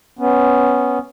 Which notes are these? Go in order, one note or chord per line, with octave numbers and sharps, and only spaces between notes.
B3 C#4